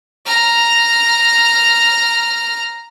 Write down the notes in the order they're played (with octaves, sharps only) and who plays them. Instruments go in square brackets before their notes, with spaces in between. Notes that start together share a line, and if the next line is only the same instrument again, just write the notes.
[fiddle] A#5 F6